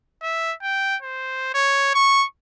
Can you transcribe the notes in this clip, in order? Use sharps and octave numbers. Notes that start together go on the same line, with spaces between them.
E5
G5
C5
C#5
C#6